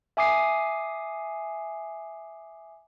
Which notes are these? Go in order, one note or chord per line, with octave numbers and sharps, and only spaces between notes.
E5 G#5 D6 D#6 C7